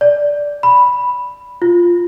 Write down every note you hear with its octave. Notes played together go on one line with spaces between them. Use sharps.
D5
B5
F4